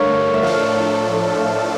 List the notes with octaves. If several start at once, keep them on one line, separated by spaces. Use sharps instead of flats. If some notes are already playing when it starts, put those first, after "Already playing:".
Already playing: G2 D3 A3 A#4 C#5 F5
E5
A2 F3 A3 D4 A4 F5